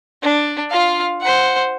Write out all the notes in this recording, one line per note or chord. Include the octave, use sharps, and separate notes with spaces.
D4
F4 F5
C5 F#5